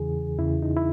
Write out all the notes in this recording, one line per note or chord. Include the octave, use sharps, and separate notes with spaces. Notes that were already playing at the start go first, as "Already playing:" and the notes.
Already playing: E2 C#3 E3 G#4
E2 C#3 E3 E4
D#4
E4